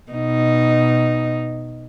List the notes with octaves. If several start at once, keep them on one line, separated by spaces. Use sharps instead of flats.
B2 D#4